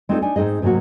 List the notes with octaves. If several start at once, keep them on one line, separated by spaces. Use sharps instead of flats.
G#3 C4 D4 D#4 F4 A4
D4 D#4 G#5
G#2 C4 D#4 G#4 D#5
G#2 C3 F#3 A#3 F#4